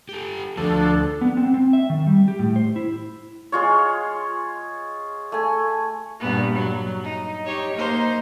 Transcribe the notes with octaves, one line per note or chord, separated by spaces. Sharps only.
G4 A4
D2 F3 D4 A4
B3
C4
C4
E5
D#3
G3
G4
A2
C5
E4
G#3 F4 C#5
A3 G#5
G2 A#2 B3
F#3
D#4
D#4 G4 C#5
A#3 D#4 C5